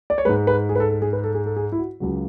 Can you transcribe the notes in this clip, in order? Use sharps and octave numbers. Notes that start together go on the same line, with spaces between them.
D5
C#5
G#2 G#3 B4
B4
G#4
B4
A4
A4
G#4
B4
A4
G#4
A4
G#4
E4
F#4
C#2 C#3 F#3 F#4